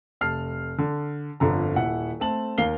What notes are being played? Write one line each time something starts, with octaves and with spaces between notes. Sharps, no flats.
F1 A5 F6 C7
D3
G1 F2 D3 A#5
D#1 E4 F#5
A3 C4 A5 F#7
D#2 A#4 F5 C7 G7